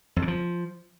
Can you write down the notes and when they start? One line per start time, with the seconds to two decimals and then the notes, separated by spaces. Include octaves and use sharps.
0.16 F2
0.22 C#3
0.28 F3